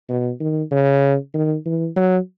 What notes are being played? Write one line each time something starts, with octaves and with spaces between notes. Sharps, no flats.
B2
D#3
C#3
D#3
E3
F#3